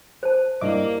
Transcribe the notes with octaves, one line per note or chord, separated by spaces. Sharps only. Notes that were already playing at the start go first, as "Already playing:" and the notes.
C5 A5
G2 A#3 E4 D5 D#5 D6